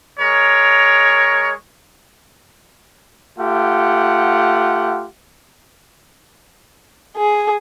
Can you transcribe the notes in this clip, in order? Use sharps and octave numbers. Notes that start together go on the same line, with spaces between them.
G#3 A#4 C#5
A3 F4 G4 F#5
G#4